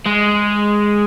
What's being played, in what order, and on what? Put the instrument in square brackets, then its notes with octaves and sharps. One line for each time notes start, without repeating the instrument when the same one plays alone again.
[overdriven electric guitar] G#3